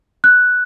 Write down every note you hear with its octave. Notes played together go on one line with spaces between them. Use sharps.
F#6